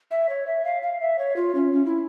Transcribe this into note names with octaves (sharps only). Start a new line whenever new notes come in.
E5
C#5
E5
F5
F5
E5
C#5
F4
C#4
C#4
E4